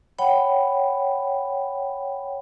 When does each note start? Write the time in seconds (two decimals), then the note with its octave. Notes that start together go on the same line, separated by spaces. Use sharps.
0.19 C#5 F#5 G5 B5